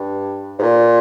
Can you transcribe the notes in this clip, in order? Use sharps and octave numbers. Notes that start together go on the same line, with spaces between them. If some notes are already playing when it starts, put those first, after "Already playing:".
Already playing: G2
G#2
A#2